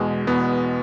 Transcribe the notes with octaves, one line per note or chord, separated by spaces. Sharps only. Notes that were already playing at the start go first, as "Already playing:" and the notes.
Already playing: E2 B2 G#3
E2 B2 B3